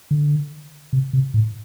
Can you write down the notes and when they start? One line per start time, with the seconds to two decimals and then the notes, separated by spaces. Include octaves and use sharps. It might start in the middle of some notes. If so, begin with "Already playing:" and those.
0.11 D3
0.93 C3
1.13 C3
1.34 A2